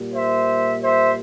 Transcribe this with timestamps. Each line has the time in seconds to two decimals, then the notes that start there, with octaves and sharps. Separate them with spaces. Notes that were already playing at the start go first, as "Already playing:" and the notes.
Already playing: A#2 G3 A#3
0.14 C5 E5
0.82 C5 E5